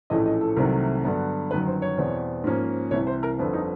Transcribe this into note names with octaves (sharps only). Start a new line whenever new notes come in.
A#1 A2 E3 A3 C#4 D#5
D#5
A4
C2 C3 D#3 F#3 A3 A#4
G2 D3 F#3 B3
G1 F#2 D#3 F#3 B4
C5
C#5
E2 B2 G3 C4
G#2 F3 A#3 C#4
C2 C3 E3 C#5
C5
A#4
G1 F2 D3
D#4